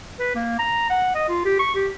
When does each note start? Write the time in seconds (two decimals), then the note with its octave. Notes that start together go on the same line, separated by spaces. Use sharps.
0.20 B4
0.35 A#3
0.59 A#5
0.90 F#5
1.15 D#5
1.29 F4
1.45 G4
1.59 C#6
1.75 G4